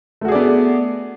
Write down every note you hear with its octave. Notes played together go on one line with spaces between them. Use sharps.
A3 B3 F#4 G#4 D5